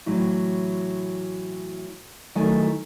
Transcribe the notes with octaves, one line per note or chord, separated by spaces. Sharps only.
A2 E3 F#3 E4
D#3 F#3 A3 E4 G#5